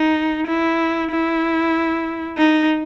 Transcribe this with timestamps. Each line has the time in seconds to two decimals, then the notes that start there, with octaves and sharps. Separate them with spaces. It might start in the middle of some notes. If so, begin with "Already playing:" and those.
Already playing: D#4
0.47 E4
1.10 E4
2.38 D#4